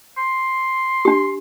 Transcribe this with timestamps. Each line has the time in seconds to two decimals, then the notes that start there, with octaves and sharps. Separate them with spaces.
0.18 C6
1.05 D4 G4